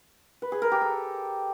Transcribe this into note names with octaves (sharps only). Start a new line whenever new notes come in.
B4
G#4
A#4
G4
A4